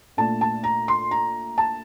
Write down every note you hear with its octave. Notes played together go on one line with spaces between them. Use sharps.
A#2 A3 D4 A5
A5
A#5
C6
A#5
A5